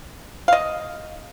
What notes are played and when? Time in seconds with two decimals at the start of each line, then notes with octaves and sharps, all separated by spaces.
0.48 F5
0.53 D#5